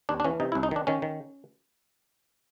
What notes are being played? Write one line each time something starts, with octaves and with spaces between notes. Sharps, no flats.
D#2 D4
D4
E3 C#4
C3 D#4
E4
C2
D#4
D#3 D4
D#3 C#4
D#3